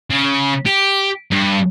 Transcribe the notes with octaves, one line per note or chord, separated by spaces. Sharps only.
C#3
G4
G2